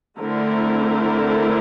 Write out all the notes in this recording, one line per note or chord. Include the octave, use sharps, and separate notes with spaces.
D3 A3 C4 E4 A#4